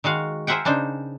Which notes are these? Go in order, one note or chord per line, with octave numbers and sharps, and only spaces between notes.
D#3 G#3 F#4 F5
G#4 A#4 C5 E5 F#5 G5
C#3 D4 D#4 C5